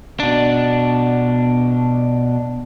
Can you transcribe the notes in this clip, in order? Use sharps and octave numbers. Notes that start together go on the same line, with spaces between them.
B2 D4